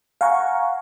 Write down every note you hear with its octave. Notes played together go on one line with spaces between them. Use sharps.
F5 F#5 G#5 A#5 C#6